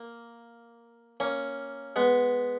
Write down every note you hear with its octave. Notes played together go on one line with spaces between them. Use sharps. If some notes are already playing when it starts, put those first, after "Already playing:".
Already playing: A#3
A#3 C#4
G#3 B3